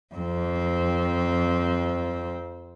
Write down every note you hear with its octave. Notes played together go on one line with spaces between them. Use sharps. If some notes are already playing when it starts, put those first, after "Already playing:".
F2 C4